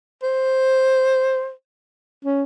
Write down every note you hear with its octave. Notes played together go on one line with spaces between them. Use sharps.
C5
C#4